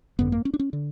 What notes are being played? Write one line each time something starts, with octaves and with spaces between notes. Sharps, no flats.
G#1 F#2 D3 B3
A#3
C#4
D4
C#4
D3